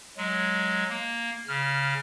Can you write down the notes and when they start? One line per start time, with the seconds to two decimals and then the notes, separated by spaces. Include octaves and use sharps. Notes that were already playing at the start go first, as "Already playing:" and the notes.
0.17 F#3 G#3
0.89 A#3
1.48 C#3 F6